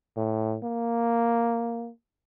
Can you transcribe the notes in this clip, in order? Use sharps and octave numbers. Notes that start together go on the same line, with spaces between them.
A2
A#3